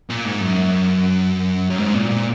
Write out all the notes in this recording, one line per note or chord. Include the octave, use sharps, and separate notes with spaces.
A#2
G#2
F#2
F#2
G#2
A#2
A#2